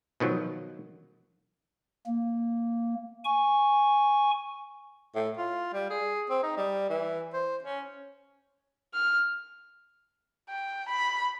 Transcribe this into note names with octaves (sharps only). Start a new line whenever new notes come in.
B2 D#3 F3 F#3
A#3
G#5 C#6
A2
F4
G3
G#4
C4
D#4
G3
E3
C5
C#4
F6
G5
B5